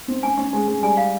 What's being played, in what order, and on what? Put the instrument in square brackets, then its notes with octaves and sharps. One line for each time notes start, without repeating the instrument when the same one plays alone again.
[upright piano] C4
[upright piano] C#4 [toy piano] G#5
[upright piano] C#4
G#3
G#3
[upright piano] G3 [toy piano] G#5
[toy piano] F5